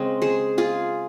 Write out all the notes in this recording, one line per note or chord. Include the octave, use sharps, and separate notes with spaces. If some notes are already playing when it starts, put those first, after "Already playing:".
Already playing: C#3 G#3 C4 D#5
G#4 C5
F4 G#4